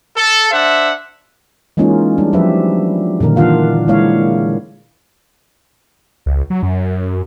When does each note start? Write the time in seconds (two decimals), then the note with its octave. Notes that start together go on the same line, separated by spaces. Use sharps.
0.17 A4
0.52 D4 C5 E5 F#5
1.77 E3 G#3 A#3 C#4 D#4 F4
2.18 G3 D4
2.33 F3 F#3 G4 B4 E5
3.20 A#2 D3 D#3 A#4
3.36 E3 D4 F4 F5 F#5
3.88 G#3 A#3 E4 C#5 F5
6.26 C#2
6.50 F#3
6.63 F#2